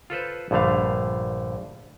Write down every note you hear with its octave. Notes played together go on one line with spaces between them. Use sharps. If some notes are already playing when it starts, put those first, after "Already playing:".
F4 A4 B4 C5
A#1 G2 D3 A3 F5